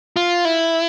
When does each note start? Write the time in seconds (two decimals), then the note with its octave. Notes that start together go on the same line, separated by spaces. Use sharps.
0.16 F4
0.45 E4